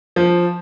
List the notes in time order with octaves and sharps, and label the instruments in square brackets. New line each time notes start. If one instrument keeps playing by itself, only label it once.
[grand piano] F3